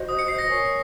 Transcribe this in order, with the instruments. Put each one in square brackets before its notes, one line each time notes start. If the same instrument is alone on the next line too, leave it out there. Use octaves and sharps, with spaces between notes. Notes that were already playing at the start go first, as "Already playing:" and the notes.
Already playing: [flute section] F#4 C5 D#5
[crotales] D#6
C#7
C7
A#6
[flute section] A#4 C#5 G#5 C#6